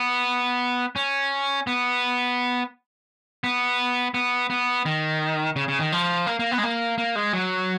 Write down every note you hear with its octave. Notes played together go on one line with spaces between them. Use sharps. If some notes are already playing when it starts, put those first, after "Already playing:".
Already playing: B3
C#4
B3
B3
B3
B3
D#3
C#3
C#3
D#3
F3
A#3
A#3
B3
G#3
A#3
A#3
G#3
F#3